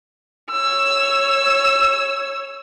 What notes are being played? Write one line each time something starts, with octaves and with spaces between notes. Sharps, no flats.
C#5 E6